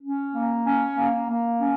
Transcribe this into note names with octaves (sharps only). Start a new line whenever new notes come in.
C#4
A#3
C#4
A#3
A#3
C#4